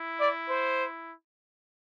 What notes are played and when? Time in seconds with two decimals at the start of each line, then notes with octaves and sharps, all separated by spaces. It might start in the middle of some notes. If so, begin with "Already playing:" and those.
Already playing: E4
0.20 D5
0.49 C5